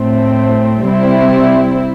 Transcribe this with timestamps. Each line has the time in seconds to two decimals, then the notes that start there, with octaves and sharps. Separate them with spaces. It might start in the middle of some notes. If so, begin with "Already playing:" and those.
Already playing: A2 A3 C4
0.85 C3 G3 C4 E4